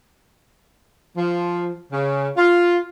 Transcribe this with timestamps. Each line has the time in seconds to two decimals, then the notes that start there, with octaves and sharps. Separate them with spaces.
1.17 F3
1.92 C#3
2.37 F4